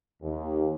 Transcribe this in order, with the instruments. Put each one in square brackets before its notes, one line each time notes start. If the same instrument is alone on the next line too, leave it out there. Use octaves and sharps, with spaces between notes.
[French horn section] D#2